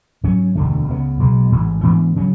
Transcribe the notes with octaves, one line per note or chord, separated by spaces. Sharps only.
G#2 F#3 C#4
E1 D2 D3 A3
C#2 C#3 G#3 B3
B1 B2 G#3
A1 G#2 E3
G#2 E3 B3 D4
C#3 F#3 C#4